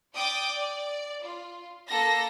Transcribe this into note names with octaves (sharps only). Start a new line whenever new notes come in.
D5 G5 D6 D#6
D5
F4
A#3 A4 A#6